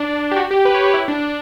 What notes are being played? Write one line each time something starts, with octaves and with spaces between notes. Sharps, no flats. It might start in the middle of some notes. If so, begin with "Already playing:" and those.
Already playing: D4
G4
F#4
G4
B4
C#5
B4
E4
D4
D4